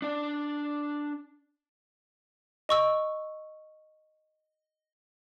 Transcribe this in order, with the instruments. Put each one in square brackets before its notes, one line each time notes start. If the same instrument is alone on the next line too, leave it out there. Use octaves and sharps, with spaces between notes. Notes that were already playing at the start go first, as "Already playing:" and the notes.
[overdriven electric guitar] D4 D5
[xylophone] D#5 C#6 E6